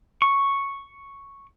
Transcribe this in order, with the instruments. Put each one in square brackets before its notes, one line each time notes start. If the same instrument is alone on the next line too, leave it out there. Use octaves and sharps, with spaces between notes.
[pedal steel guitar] C#6